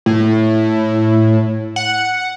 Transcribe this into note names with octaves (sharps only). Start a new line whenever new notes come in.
A2
F#5